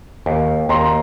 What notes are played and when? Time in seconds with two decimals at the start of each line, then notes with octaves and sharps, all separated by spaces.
0.26 D#2
0.69 D#2 A#5 C6